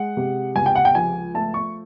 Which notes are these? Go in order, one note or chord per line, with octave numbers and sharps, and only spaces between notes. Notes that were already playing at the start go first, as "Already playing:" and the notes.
Already playing: G#3 F#5
C3
C#2 G#5
G5
F#5
G5
F3 G#5
A3 A5
C#6